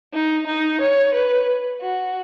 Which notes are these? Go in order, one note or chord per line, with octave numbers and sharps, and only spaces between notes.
D#4
D#4
C#5
B4
F#4